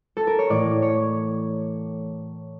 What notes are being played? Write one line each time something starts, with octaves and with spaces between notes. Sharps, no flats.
A4
A#4
C#5
A2 E3 D5
C#5